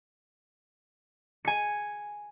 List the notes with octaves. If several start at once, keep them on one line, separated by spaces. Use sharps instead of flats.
G#5 C#7